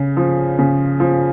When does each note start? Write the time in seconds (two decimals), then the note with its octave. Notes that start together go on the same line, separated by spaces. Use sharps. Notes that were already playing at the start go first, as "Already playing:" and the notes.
Already playing: C#3
0.17 F3
0.59 C#3
1.00 F3